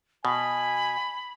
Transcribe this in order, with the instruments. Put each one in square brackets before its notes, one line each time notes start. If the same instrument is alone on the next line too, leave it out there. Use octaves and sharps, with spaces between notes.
[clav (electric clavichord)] B2 [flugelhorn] G#5 [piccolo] B5